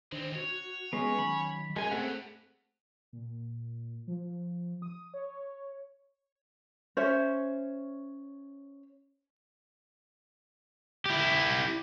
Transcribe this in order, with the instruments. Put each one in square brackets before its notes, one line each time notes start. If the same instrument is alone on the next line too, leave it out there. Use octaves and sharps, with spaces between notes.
[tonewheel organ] D#3 D4 C5 [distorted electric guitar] G#3 C4
[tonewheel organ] F#4 [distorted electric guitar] C#5
[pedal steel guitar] G#3 B3 [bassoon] C#4
[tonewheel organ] D#3 F#3 [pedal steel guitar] B5
[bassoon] F#2 [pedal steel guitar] G#3 G#5 [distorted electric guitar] C#4 [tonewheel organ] G4 A#4
[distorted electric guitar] G2 [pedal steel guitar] A3 C4 F#5 [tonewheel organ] G#4
[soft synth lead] A#2
F3
D#6
C#5
[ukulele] C#4 C5 C#5 E5
[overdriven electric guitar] E4 G4